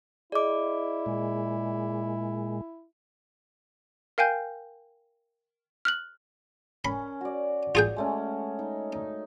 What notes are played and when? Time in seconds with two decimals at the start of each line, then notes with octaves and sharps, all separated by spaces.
0.32 E4 G#4 D5 D#5 D6
1.06 A#2 G#3
4.18 A#4 F5 G5 G#5 G6
5.85 F6 F#6 F#7
6.85 C#4 A#4 B5
7.21 F#4 D5
7.75 F4 G#4 G5
7.97 G#3 A3 C#4
8.59 D#4
8.92 D#4